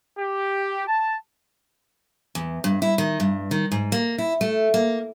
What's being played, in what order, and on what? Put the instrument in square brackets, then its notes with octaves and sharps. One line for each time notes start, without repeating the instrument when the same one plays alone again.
[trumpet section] G4
A5
[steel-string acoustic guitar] E2
G2
E4
D#3
G2
D#3
G#2
A#3
E4
A3
A#3